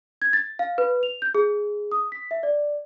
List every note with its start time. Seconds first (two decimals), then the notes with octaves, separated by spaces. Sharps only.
0.22 G#6
0.33 A6
0.59 F5
0.78 B4
1.03 F7
1.22 G6
1.35 G#4
1.92 D#6
2.12 B6
2.31 E5
2.43 D5